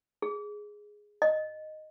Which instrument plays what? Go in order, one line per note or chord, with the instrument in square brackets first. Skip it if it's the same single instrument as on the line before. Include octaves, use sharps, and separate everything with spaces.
[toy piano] G#4
D#5